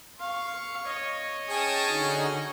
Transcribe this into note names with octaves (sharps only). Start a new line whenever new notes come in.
F5 C#6
C#5 D#5
C#4 G#4 G5 A5 D#6
D3 D#4 F#4